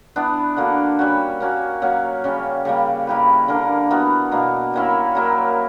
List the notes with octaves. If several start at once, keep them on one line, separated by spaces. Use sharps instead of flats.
E3 B3 D4
D3 A#3 D4 F#4
G3 C#4 F#4
A#3 C#4 F#4
F#3 A#3 C#4 F#4
C#3 G3 C#4
C#3 G3 A#3
A#3 E4 G4 B4
D3 A#3 D4 A#4
E3 B3 F#4 A#4
B2 A#3 D4 A#4
G3 A#3 C#4 E4
F#3 A#3 E4 A#4